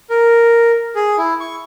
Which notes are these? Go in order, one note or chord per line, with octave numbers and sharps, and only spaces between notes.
A#4
G#4
E4
C#6